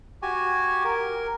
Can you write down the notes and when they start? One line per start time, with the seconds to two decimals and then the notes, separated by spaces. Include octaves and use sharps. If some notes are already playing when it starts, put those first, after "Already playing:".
0.22 F#4 G4 G#5
0.84 A#4